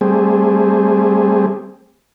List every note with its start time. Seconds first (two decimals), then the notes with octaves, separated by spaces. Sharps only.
0.01 G3 A3 C4 G#4